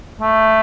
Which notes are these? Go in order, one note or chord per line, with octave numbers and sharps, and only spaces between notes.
A3